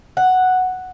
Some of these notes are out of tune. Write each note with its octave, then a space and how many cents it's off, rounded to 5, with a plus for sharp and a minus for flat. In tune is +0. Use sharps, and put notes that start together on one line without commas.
F#5 +0